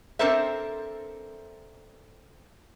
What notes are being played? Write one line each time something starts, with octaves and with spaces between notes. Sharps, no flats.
C4 D4 A4 A#4 C5 E5